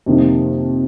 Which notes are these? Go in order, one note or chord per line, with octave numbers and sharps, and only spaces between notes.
F2 C3 D#3 A#3 D#4